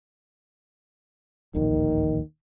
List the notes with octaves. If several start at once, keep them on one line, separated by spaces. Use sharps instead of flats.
D1 A#1 D#2 D#3